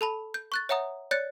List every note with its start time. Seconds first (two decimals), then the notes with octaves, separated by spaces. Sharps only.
0.01 A4 A5 B5
0.34 G6
0.52 C#6 F#6 A6
0.69 C#5 E5 F#5 A#5 D#6
1.11 C#5 D5 F#6 G6 A6 C#7